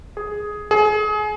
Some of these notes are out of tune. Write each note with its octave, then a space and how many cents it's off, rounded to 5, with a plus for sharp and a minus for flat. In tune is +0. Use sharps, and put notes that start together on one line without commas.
G#4 +5
G#4 +30